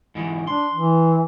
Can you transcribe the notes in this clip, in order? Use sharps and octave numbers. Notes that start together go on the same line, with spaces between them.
G#2 E3
D4 C6
E3